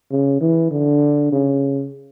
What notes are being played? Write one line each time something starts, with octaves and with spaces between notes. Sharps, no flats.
C#3
E3
D3
C#3